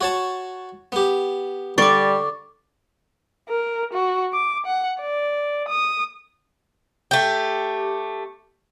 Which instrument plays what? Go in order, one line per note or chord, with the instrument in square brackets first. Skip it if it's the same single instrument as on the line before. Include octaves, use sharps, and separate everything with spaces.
[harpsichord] F#4 C#5 A5
B3 G4
[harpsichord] D3 [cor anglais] G3 [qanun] D5 [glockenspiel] C#6 D6
[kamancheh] A#4
F#4
D6
F#5
D5
D#6
[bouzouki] A3 G4